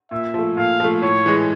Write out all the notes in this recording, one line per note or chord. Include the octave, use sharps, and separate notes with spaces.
A#2 E5
F3 A3
A#2 F5
F3 A3
A2 C#5
E3 G#3